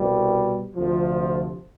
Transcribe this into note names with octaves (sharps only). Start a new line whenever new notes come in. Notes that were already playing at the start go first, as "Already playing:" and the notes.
Already playing: C2 B2 G3
D2 C3 F3